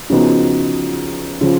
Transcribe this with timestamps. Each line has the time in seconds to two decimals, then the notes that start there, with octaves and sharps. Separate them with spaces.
0.10 C#3 F3 B3 D#4 F#4
1.41 C#3 F3